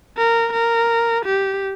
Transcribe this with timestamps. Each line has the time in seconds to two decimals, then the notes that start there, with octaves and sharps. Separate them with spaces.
0.17 A#4
0.53 A#4
1.26 G4